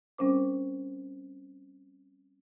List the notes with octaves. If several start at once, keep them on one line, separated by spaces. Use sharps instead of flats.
G3 C4 C#4 A#4 C5 D6